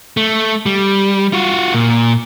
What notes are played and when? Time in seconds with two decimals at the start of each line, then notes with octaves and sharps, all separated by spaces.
0.17 A3
0.66 G3
1.33 F4 F#4
1.74 A#2